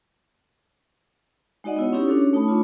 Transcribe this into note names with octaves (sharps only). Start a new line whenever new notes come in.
G#3 D#4 F#4 D5 D#5 F#5
B3 E4 C#5
C4 C#4 D#4 E4 G4
C#4 D4 F#4 A4 C#5
A3 D#4 C#5 A5 B5
A3 C4 D4 F4